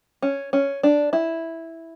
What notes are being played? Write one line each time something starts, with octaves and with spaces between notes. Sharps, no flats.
C#4
C#4
D4
E4